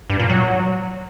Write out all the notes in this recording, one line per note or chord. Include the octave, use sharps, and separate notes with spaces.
G2
A#2
F#3